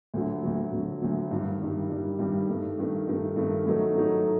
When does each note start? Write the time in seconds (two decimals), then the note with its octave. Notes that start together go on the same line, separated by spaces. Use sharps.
0.14 D2 D3 F#3
0.43 D2 D3 F#3
0.72 D2 D3 F#3
1.02 D2 D3 F#3
1.31 G2 D#3 G3
1.61 G2 D#3 G3
1.90 G2 D#3 G3
2.19 G2 D#3 G3
2.49 G2 D#3 A3
2.78 G2 D#3 A3
3.07 G2 D#3 A3
3.36 G2 D#3 A3
3.66 A2 F#3 A3 D#4
3.95 A2 F#3 A3 D#4
4.24 D#4